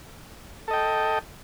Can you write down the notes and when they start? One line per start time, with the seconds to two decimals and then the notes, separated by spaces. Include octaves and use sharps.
0.68 A4
0.71 D#5
0.73 G5